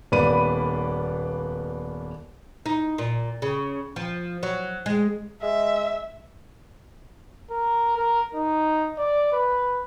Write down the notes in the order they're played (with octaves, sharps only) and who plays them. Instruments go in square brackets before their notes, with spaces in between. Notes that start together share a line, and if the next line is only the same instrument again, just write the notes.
[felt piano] D#1 A#3 B3 D5 B5 D#7
[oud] D#4
A#2
C#3
F3
F#3
G#3
[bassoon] G#3 [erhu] E5
[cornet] A#4
A#4
D#4
D5
B4